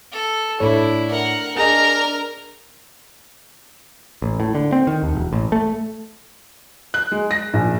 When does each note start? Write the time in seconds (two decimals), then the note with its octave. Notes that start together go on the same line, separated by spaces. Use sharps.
0.12 A4
0.60 A2 D4 E4 A4 C#5
1.11 A#4 F#5
1.56 D4 G#4 A#4 D#5 A#5
4.22 A1
4.40 A2
4.55 D3
4.72 C4
4.87 D#3
5.03 D#2
5.15 E1
5.33 A1
5.52 A3
6.94 F#6
7.12 G#3
7.31 A#6
7.53 A#1